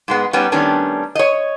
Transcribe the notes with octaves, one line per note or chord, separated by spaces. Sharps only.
G#2 G#3 B3
G3 B3 C#4 D#4
D#3 G3 A3 B3 C#4 D4
C#5 D#5